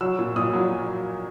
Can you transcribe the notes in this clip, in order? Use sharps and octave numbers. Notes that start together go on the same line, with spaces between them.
F#3 E6
A#2
A#2 D#6
F#3